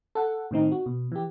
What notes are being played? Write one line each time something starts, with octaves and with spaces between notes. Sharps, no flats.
A4 F#5
A2 D#3 C4 D#4
F#4
B2
E3 G4